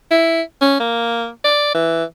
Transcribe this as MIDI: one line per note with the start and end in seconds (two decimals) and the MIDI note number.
0.11 0.42 64
0.61 0.77 61
0.80 1.29 58
1.44 1.72 74
1.74 2.04 52